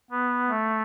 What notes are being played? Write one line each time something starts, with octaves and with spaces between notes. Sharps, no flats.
B3
A3